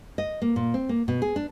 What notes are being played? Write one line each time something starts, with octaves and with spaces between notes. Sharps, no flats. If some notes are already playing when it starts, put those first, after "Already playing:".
D#5
A#3
A#2
C4
A#3
B2
G#4
D4